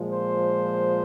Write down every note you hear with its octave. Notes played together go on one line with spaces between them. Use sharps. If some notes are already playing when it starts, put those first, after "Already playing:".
Already playing: A#2 F3 G#3
C5